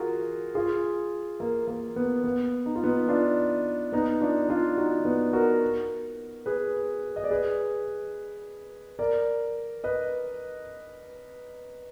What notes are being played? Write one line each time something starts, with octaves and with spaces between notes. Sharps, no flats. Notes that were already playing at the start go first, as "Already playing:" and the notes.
Already playing: F4 F#4 G#4 A#4
F4 G#4
A#3
A#3
B3
B3
D#4
F4
B3 D#4
D4 F4
B3 D#4
D4 F4
D4 F4
D#4 F#4
D4
B3
F#4 A#4
G#4 B4
D#5
D5
G#4 B4
A#4 D5
B4 D#5